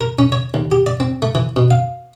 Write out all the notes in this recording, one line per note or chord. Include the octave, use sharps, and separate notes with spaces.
A#4
C#4
C#5
D#2
G4
D5
C4
A3
E3
B2
F5